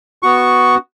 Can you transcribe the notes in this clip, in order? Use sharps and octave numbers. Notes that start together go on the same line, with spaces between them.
B3 F#4 C#6